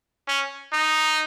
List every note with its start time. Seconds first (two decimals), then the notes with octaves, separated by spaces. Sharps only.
0.28 C#4
0.73 D#4